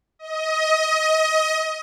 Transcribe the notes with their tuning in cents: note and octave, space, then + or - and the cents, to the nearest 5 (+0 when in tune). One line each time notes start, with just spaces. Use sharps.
D#5 +25